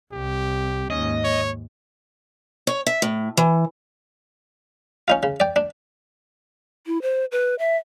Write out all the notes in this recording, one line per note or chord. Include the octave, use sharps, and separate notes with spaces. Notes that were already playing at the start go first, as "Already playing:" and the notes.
C2 G4
D#2 G#2 C#4 D#5
C#5
C#5
E5
A2
E3
C#4 D#4 F4
C#3
D5 G5
D4
E4
C5
B4
E5